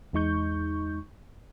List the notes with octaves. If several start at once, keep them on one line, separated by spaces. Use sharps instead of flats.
E2 G#3 D#4 C#6 G6